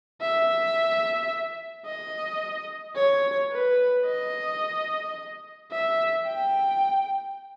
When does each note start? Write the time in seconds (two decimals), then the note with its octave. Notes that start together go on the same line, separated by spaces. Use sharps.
0.21 E5
1.85 D#5
2.96 C#5
3.51 B4
4.06 D#5
5.71 E5
6.26 G5